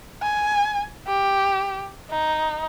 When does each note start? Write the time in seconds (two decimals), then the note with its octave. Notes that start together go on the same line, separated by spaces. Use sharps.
0.22 G#5
1.07 G4
2.10 D#4